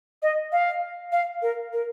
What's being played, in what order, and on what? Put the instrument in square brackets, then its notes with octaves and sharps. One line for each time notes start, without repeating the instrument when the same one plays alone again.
[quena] D#5
F5
F5
A#4
A#4